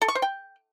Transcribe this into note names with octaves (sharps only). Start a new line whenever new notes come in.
A4
C#6
C5
G5